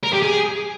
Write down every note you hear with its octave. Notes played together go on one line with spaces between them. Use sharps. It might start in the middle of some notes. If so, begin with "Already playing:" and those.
A#4
G4
G#4